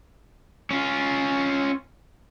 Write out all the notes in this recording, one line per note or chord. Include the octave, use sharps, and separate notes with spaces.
C#4 F4